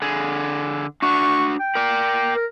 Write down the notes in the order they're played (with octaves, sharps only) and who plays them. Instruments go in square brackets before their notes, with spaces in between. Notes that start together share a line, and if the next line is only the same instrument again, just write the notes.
[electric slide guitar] D3 G#4
[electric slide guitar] D4 F#4 [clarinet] C#6
[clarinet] G5
[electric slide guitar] A#4 D5
[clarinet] A#4